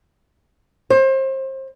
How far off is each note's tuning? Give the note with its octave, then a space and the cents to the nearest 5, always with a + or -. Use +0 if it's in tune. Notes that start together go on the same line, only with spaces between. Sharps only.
C5 +30